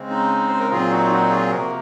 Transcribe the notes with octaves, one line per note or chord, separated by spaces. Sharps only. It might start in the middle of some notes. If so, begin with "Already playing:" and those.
Already playing: C#3 G#3 C4
D#4
C5
A#4
A#2 F#3 C4 F4 G#4
D#4 F#4
F4
D#4 F#4
F4 G#4
C3 F3 A#3 F#4 A#4